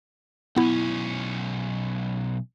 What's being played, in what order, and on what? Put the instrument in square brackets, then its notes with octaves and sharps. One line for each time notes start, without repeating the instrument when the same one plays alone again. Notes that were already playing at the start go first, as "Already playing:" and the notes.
[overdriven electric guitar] B1 C#4 [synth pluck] B3 E4